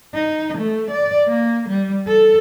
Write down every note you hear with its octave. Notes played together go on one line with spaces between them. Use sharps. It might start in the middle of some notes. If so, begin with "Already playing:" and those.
D#4
A3
D5
A#3
G3
A4